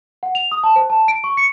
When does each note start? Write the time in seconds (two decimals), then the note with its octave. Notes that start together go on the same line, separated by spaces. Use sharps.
0.23 F#5
0.35 F7
0.52 D#6
0.64 A5
0.76 C5
0.90 A5
1.08 D7
1.24 C#6
1.37 C#7